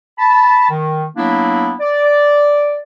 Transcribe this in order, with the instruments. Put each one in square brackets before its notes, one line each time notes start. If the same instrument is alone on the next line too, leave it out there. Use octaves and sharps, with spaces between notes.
[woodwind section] A5 B5
D#3
F#3 A#3 B3 D4 E4
D5